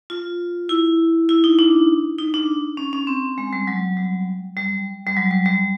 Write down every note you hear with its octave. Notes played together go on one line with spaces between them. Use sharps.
F4
E4
E4
D#4
D4
D#4
D4
C#4
C#4
C4
G#3
G3
F#3
G3
G3
G3
F#3
G3
G3